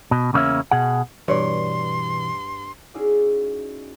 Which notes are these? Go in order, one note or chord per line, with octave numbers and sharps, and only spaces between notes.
B2
E2 C#3 E3 A#3 C#4 E5
B2 G#4 F#5
G2 B2 E3 C#5 D5 C6
C#4 D#4 E4 F#4 G#4 D5